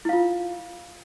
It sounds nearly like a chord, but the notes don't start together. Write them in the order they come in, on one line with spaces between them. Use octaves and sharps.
E4 F5 F4